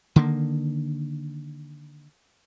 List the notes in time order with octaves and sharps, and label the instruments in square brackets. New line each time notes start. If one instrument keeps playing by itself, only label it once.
[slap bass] D3 D#3 A#3